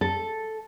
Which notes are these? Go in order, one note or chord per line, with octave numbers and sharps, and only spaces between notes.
A4